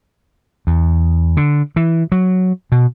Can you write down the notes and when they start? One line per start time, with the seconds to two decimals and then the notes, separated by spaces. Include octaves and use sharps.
0.67 E2
1.37 D3
1.76 E3
2.12 F#3
2.72 B2